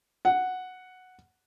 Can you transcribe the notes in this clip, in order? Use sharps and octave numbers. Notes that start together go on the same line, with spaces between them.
F#5